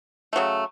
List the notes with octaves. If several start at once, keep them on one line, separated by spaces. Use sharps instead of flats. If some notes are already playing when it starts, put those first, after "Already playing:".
C#3 F#3 A3